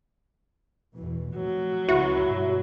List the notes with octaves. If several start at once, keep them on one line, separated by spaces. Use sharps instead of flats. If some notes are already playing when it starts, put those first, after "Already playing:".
E2 B2 E3
F1 A#2 F#3
C#2 E4 F#4
G2 B2